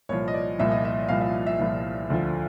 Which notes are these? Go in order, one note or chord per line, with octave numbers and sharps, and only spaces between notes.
C2 A#2 F3 C#5
D#5
D5
C2 A#2 F3 E5
D#5
E5
C2 A#2 F3 F5
E5
E5
C2 A#2 F3
D2 D3 F3